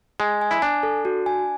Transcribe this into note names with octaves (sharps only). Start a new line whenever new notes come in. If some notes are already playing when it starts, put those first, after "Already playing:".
G#3 G#5
G#5
E4
D4 G#5
A4
F#4
G#5